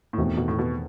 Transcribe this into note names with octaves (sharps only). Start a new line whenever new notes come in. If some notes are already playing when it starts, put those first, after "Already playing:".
A2
E2 B2 D#3 A3 C4
B2
A2
B2